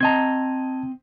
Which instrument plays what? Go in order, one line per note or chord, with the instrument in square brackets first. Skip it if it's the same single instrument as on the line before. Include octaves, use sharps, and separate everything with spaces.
[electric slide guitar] C4 D#5 A#5 [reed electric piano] A5 G#6